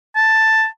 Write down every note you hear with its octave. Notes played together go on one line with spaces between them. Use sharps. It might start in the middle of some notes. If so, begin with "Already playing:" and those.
A5